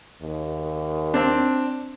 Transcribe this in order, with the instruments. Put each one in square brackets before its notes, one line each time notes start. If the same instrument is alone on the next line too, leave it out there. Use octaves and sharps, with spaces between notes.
[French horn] D#2
[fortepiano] C4 D4